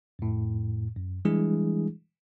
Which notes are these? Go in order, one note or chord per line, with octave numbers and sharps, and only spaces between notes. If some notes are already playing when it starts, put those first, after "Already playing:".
F2 A2
F#2
E3 G3 G#3 D4 E4 G#4